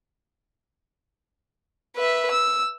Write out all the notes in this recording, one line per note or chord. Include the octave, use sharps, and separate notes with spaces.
B4 E5
E6